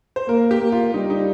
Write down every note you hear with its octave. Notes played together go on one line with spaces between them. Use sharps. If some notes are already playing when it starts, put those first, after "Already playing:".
C5
A#3 A#4
G4
A#3
F4
G3 D#4
D#4